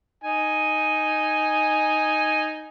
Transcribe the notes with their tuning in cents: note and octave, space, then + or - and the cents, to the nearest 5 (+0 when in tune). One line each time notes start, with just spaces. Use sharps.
D#4 +0 G#5 +0